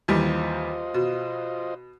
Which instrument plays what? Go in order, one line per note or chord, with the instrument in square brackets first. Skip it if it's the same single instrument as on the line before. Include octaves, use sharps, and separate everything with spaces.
[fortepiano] D#2 E3 G3 [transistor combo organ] F4 C5 D#5
[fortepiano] B2